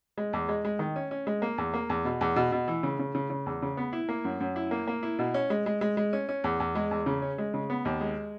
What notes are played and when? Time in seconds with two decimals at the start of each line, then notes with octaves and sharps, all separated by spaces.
0.17 G#3
0.33 E2
0.49 G#3
0.65 G#3
0.79 D#3
0.96 C#4
1.11 C#4
1.27 G#3
1.42 A#3
1.58 E2
1.74 A#3
1.90 E2
2.05 B2
2.21 E2
2.36 B2
2.52 B2
2.68 E3
2.83 C#3
2.99 C#3
3.15 C#3
3.30 C#3
3.46 E2
3.62 C#3
3.77 B3
3.93 E4
4.09 A#3
4.24 F#2
4.40 F#2
4.56 E4
4.71 A#3
4.87 A#3
5.03 E4
5.19 B2
5.34 C#4
5.50 G#3
5.66 G#3
5.81 G#3
5.97 G#3
6.13 C#4
6.29 C#4
6.44 E2
6.60 E2
6.75 G#3
6.91 E2
7.06 C#3
7.22 C#4
7.38 G#3
7.54 C#3
7.70 B3
7.85 D#2
8.01 G#3